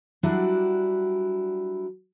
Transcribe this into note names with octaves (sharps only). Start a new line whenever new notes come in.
F#3 G3 D4 E4 F#4 D5